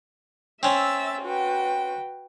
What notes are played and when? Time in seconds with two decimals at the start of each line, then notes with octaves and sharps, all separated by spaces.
0.63 C4 C#4 E5 E6 A6
1.22 F#4 B4 G5